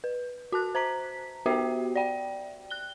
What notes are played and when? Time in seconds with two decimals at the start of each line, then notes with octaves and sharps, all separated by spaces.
0.04 B4
0.52 F#4 A5 F#6
0.75 C5 A#5 B6
1.46 B3 F#4 G4 C5 E5 G5
1.96 D5 G5
2.70 F#6 G7